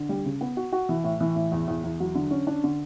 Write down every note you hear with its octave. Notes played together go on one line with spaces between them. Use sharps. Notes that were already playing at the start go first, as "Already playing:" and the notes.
Already playing: D3
G3
C#3
B3
F#4
F#4
E3
A2
E3
A2
E2
E2
E2
F#3
D3
C#4
D4
D3